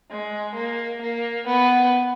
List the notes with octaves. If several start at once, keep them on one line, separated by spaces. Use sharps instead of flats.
G#3
A#3
A#3
B3